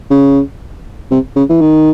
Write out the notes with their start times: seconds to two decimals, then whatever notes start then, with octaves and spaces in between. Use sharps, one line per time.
0.10 C#3
1.11 C3
1.36 C#3
1.50 E3
1.61 D#3